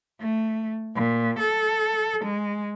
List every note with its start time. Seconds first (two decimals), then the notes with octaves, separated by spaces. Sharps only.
0.20 A3
0.95 A#2
1.39 A4
2.24 G#3